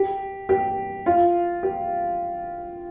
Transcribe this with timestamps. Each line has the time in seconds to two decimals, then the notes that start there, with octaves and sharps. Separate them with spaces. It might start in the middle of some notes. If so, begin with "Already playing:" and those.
Already playing: G4
0.49 G4
1.06 F4
1.63 G4